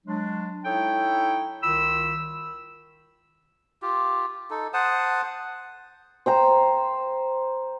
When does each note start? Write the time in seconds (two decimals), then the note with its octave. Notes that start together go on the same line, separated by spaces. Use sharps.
0.06 F#3 G#3 D4
0.65 D#4 E4 A4 C#5 G5
1.63 C2 D#3 F4 B5 E6
3.82 F4 G4
4.50 D#4 A4
4.74 C5 F#5 A5 D#6
6.26 C5 G5 A#5